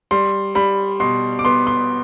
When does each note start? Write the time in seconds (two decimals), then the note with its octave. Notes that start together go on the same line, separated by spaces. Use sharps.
0.11 G3 C6
0.55 G3 B5
1.00 B2 C6
1.39 D6
1.45 B3 C6
1.67 C6